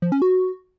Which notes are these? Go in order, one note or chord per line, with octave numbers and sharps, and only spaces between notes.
F3
C#4
F#4